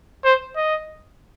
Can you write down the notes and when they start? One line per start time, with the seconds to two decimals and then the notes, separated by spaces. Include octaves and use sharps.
0.25 C5
0.56 D#5